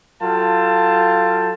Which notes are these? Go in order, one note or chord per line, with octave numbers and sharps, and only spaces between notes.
F#3 F4 A4 F5 G5 A5